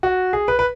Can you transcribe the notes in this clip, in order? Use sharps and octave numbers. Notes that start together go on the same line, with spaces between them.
F#4
G#4
B4
B4